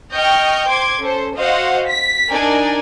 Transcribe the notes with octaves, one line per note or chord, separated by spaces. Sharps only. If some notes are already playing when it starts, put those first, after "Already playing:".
D#5 G5 C#6 F6 G6
C5 C6 D6 G#6
C#4 A4 C5
F#4 C5 D#5 F5 F#5
B6
D4 D#4 A#4 D5 G#5